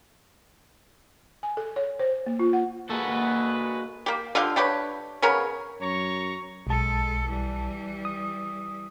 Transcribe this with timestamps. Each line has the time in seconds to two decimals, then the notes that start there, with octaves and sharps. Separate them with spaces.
1.43 G#5
1.57 A4
1.76 C#5
2.00 C5
2.26 A#3
2.39 F4
2.53 F#5
2.90 G2 G#3 A#3 F#4 A4 B4
4.06 A#3 G4
4.35 D3 F4 G4 F5
4.56 D4 G4 B4 C#5
5.22 C#3 B3 A#4 C#5
5.81 F#2 C#5 A#5 C#6
6.67 B1 G#3 A4 A5
7.29 E3 G3
8.05 D#6